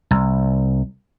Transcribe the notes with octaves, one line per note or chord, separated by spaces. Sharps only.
C2